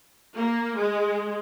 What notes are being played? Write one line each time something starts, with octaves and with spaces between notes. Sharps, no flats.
A#3
G#3